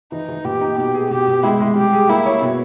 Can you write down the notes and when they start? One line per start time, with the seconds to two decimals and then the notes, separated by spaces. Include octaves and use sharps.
0.12 E3 D#4
0.29 E3
0.45 A#2 G4
0.61 D#4
0.78 B2 G4
0.94 G#4
1.10 B2 G4
1.27 B2
1.43 G#3 E4
1.60 G#3
1.76 G3 G4
1.93 G#4
2.09 A#3 E4
2.26 C#5
2.42 B2